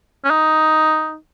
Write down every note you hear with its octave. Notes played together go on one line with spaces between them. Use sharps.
C#4
D#4